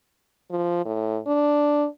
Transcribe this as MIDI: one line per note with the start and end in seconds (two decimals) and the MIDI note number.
0.51 0.83 53
0.85 1.19 45
1.27 1.87 62